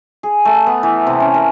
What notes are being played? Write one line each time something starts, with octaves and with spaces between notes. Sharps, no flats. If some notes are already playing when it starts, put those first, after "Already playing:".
G#4
A3
B3
E3
C3
C#4
A#4